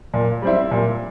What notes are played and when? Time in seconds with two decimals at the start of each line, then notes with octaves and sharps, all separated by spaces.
0.14 A#2
0.42 G3 C4 E4
0.71 A#2